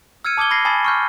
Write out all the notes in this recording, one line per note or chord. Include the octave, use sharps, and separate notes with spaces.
E6 F6 G#6 C#7 D#7
A5 D6 D#6 G#6 G7
B5 G#6 A#6 C7
G#5 A5 B5 D#6 A6
C#6 F6 G6